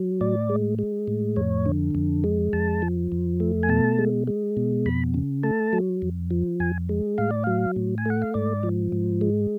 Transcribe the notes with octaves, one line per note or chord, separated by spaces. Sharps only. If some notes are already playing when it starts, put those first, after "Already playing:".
Already playing: F#3
A2 D5
G#3
G#3
A2
F2 C#5
D3
F2
G#3
F2 A5
F3
F2
A3
G#5
B2 A5
G#3
G#3
B2
F2 B5
C#3
A3 A5
F#3
F2
F3
F2 G#5
G#3
A2 F5
D5
F#3 F5
A2
G#5
A3 F#5
F5
G#2 D5
F3
G#2
G#3